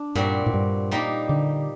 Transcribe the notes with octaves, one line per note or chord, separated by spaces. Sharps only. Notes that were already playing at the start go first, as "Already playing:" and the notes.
Already playing: D4
G2 A#2 G3 C4 F#4
A2
G2
G3 A#3 D#4 G4
D3